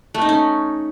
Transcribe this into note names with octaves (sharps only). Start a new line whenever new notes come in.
A3
D#4
C#4